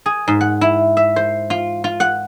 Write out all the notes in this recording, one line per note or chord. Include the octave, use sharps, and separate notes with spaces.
G#4
G#2
F#5
E4
E5
C5
F4
F4
F#5